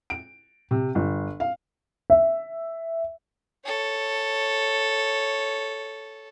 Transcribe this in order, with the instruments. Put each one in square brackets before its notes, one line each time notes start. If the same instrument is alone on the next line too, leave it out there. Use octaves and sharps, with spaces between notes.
[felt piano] D7
C3
G1
F5
[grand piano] E5
[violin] A4 C#5